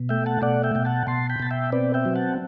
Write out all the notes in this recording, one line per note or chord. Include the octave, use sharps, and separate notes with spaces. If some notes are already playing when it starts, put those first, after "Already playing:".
Already playing: B2
A3 E5 G5
F#5 A5
B2 D5 F#5
E5 G5
B2 G5
F#5 A5
B2 A5 C6
G5 B5
B2 A5
E5 G5
C4 B4 D5
E5 G5
F#3
F#5 A5